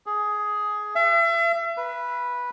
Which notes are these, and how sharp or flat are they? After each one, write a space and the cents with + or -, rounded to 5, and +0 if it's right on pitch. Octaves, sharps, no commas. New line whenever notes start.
G#4 +10
E5 +40
B4 -10